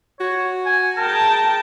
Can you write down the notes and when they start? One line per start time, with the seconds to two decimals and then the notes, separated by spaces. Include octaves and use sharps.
0.20 F#4 C#5
0.66 G#5
0.97 G#4 A#4 G5 A5